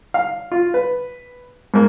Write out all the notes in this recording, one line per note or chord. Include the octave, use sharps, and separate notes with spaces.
F5
F4
B4
G#2 A#3